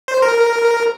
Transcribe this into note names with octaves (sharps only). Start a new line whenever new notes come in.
C5
A#4